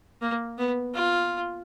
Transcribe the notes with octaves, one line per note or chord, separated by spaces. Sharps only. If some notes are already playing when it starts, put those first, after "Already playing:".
A#3
B3
F4